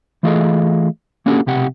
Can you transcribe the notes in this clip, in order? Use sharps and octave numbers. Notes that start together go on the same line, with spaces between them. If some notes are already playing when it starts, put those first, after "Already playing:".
E3 A3 F4 G#4 A4 D#5
A#3 C#4 D4 F#4 G4 A4
B1 C3 G4 F#5